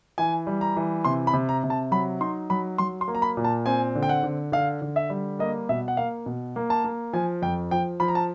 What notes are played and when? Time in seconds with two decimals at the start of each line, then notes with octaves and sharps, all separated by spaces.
0.18 E3 G#5
0.47 G3
0.61 A#5
0.77 E3
1.05 C3 C6
1.27 B5
1.33 C3
1.49 A#5
1.64 C3
1.70 A5
1.91 F#3 B5
2.20 D#4 C6
2.50 F#3 B5
2.78 F#3 C6
3.01 C6
3.08 A#3
3.15 A#5
3.22 B5
3.37 A#2
3.44 A5
3.66 C4 G#5
3.95 D3
4.03 G5
4.09 F#5
4.23 D3
4.52 D3 F5
4.82 D3
4.96 E5
5.10 G3
5.39 A#3 D#5
5.69 B2 E5
5.88 F#5
5.97 A#3 F5
6.26 B2
6.56 A#3
6.70 A5
6.84 A#3
7.13 F3 G#5
7.42 F2 G5
7.71 F3 G5
8.00 F3 B5
8.08 A#5
8.15 A5